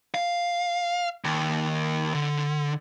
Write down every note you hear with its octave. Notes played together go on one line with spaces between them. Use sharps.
F5
D#2
D3